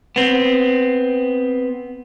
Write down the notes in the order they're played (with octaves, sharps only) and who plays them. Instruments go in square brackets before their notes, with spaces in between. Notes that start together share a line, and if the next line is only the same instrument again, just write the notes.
[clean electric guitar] B3 C4